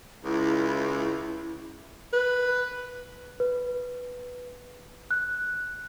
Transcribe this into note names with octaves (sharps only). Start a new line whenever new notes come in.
C#2 E4
B4
B4
F#6